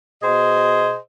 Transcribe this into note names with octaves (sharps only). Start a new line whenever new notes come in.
B2 G#4 C5 D#5